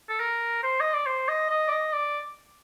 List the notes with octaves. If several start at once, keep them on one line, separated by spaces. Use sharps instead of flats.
A4
A#4
C5
D#5
D5
C5
D#5
D#5
D5
D#5
D5